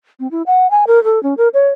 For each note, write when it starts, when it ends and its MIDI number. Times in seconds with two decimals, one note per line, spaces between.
0.20 0.30 60
0.31 0.42 64
0.46 0.70 78
0.71 0.85 80
0.87 1.03 70
1.04 1.21 69
1.23 1.34 61
1.37 1.48 70
1.54 1.69 73